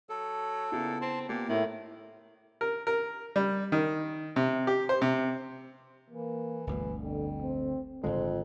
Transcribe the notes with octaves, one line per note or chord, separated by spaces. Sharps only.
F#3 A4
A#2 C#3 B3 E4
C4 A5 C6
A#2 A#3 B3 G4
A2 D#3 A3 A#3 E4
A#4
A#4
G3
D#3
C3
G4
C5
C3
E3 A#3
G1 D2 B2 E3
F2 D3
C4
G#1 F2 A#2 D3 G#3 C5